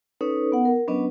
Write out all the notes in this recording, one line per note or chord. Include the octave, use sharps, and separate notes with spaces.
C#4 D#4 A4 B4 C#5
B3 F#5
A#4
F#3 B3 C#4 D4 B4 D#5